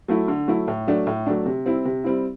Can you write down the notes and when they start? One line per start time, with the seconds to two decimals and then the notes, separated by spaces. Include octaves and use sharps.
0.08 F#3 A3 E4
0.28 D3
0.48 F#3 A3 E4
0.68 A2
0.87 F#3 A3 D4
1.07 A2
1.26 F#3 A3 D4
1.46 C3
1.66 G3 C4 E4
1.85 C3
2.04 G3 C4 E4